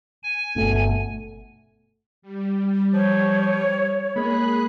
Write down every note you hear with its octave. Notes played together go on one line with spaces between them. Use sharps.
G#5
G1 B2 A3
G3
F3 C#5
G#3 A#3 G#4 B5 F#6